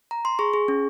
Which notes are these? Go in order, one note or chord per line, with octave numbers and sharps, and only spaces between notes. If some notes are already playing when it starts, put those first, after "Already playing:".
A#5
C6
G#4 C#6
G#4
C#4